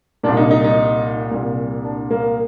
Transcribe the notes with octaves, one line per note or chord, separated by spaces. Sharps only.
C2 A#2 D4
D#4
D#4
D#4
C2 A#2
D4
A#3